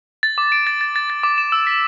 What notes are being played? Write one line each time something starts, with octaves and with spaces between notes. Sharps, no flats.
A6
D6
D7
A6
A6
A6
A6
D6
E7
E6
B6